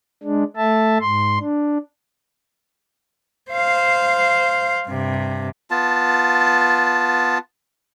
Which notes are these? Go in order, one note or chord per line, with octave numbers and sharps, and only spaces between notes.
G#3 D4
A3 E5 A5
G#2 C6
D4
C5 F5
G2 C3
B3 F4 A5